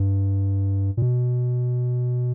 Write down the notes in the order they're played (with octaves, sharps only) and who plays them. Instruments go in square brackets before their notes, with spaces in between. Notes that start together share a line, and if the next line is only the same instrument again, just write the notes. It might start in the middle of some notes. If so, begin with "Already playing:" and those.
Already playing: [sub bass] G2
A#2
B2